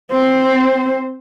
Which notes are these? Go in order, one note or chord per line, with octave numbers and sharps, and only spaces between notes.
C4 C5